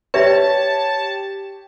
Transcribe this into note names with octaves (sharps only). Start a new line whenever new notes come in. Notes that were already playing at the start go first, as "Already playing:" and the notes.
G4 B4 C#5 D5 E5 A5